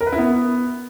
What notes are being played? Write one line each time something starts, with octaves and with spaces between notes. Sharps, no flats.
A#4
B4
E4
B3